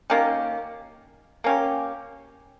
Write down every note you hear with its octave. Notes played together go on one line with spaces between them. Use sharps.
D#3 A#3 C#4 G4
A#3 C#4 G4